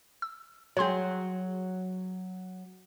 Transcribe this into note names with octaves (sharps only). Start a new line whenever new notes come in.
E6
F#3 G#4 C#5 C6 G6